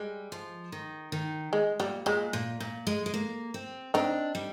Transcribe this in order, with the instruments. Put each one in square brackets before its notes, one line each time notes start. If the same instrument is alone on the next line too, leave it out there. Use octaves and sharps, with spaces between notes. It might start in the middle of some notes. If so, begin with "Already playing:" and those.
Already playing: [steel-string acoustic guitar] G3 [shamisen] G#3
[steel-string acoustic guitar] F3
D#3
D#3
[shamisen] G#3
[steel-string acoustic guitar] A#2 [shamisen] G3
[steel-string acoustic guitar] A#2 [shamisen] G#3
[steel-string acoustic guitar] A#2
A#2
G#3
G#3
A#3
C4
[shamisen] C4 D#4 [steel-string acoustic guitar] D4
[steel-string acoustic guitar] G3